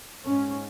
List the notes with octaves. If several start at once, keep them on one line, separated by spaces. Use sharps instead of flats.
G#2 C#4